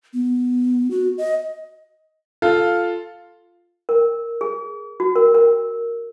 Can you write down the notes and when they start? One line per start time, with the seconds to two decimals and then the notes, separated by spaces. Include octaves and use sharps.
0.14 B3
0.91 F#4
1.18 D#5
2.42 F4 A4 F5
3.89 A#4
4.41 G#4
5.00 F#4
5.16 A#4
5.34 A#4